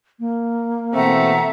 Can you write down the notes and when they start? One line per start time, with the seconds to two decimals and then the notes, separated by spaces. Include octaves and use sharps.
0.20 A#3
0.94 B2 E3 A3 C4 E5 F#5 A#5